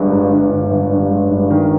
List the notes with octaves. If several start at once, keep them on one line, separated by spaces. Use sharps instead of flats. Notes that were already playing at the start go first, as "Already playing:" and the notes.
Already playing: G1 G2 G#3
G2
G1
G1
G1
G2
G#3
G2
D#3